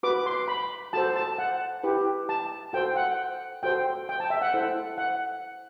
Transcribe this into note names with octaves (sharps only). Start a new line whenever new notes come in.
F#4 B4 D6
C6
B5
F#4 A4 C5 A5
A5
F#5
E4 G4 B4
A5
F#4 A4 C5 G5
F#5
F#4 A4 C5 G5
G5
A5
E5
F#5
E4 A4 C5
F#5